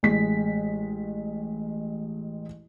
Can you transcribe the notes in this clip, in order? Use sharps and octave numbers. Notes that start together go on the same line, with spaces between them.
A1 G#3 B6